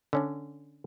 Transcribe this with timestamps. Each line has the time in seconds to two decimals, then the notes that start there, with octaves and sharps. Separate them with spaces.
0.13 D3 C#4 D4